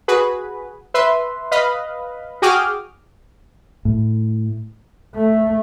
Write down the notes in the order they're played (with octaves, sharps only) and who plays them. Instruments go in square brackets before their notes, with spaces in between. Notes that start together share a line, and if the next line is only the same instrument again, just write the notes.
[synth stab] F#4 G#4 B4
B4 E5 C6
B4 D#5 F5 B5
F#4 G#4 G5 D6 D#6 F6
[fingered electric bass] A2
[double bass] A3